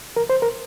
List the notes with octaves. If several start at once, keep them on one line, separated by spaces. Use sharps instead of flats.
A#4
C5
A#4